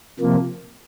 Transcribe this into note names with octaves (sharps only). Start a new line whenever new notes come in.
C3 F3 A#3